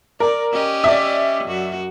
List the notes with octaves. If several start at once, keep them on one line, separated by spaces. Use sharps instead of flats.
A#4 D5
C#4 G4 D#5
D5 E5
F#2 F#4